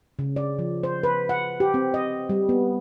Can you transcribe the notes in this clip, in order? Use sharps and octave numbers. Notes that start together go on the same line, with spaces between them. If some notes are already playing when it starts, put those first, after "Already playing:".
C#3
D5
F3
C5
B4
F#5
G4
C4
D#5
G3
B3